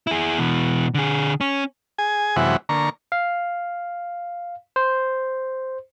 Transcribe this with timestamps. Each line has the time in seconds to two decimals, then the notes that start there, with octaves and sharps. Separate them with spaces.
0.07 E4 G#4
0.38 B2 E3
0.94 D3 G#4
1.41 C#4
1.98 G#4 G#5
2.36 F#2 C3 E3 G#3 E4 F#5
2.69 D3 A#3 A#5 C#6
3.12 F5
4.76 C5